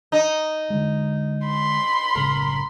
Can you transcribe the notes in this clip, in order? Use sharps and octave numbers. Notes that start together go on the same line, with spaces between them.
D#4
D3 G#3
B5 C6
F#1 A2 C#3 A#4